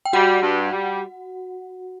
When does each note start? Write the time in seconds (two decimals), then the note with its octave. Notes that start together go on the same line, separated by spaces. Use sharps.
0.05 G5
0.13 G3 F#4 F#5
0.42 G2
0.72 G3